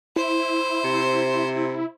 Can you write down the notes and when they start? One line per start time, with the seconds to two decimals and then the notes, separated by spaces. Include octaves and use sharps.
0.16 E4 C5
0.85 C3